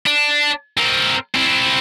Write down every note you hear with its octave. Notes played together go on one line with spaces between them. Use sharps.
D4
C4 A#4
C4 E4